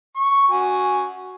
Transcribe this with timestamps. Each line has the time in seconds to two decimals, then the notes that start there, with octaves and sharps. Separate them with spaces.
0.17 C#6
0.51 F#4 G#5